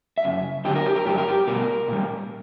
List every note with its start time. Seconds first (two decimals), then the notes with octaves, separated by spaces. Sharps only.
0.18 E5
0.23 F#2 C#3
0.64 G2 D3 F#3 G4
0.75 A#4
0.86 G4
0.96 A#4
1.06 G2 F#3 G4
1.18 A#4
1.28 G4
1.47 B2 G3 A#4
1.88 A#2 G3